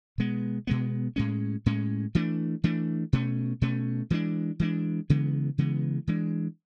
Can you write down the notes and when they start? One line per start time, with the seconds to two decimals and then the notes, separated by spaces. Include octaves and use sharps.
0.18 B2 G#3 B3
0.67 B2 G#3 B3
1.16 A2 G#3 C#4
1.66 A2 G#3 C#4
2.15 E3 A3 D4
2.64 E3 A3 D4
3.13 B2 A3 C#4
3.61 B2 A3 C#4
4.10 E3 G#3 B3 D4
4.60 E3 G#3 B3 D4
5.10 C#3 E3 G#3 B3
5.58 C#3 E3 G#3 B3
6.07 E3 G#3 D4